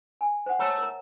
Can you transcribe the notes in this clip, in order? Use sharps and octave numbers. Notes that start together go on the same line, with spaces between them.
G#5
C5 F#5
A3 A4 C#5 A#5
A#4 A#5